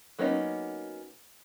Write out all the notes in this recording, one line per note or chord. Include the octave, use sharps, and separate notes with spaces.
F#3 A#3 B3 C#4 D#4